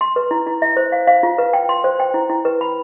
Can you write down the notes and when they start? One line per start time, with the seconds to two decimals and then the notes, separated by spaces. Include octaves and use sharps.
0.01 C6
0.16 B4
0.31 E4
0.47 E4
0.62 E5
0.77 C5
0.92 F5
1.07 F5
1.23 F4
1.38 B4
1.53 G5
1.69 C6
1.84 C5
2.00 G5
2.14 E4
2.30 E4
2.45 B4
2.61 B5